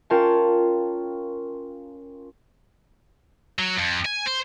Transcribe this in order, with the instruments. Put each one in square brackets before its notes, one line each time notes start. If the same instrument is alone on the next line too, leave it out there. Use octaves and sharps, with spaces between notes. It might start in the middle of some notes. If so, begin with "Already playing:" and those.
[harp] C#4 F4 A#4 C#5 G5 A5
[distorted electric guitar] F#3
F2
G#5
C5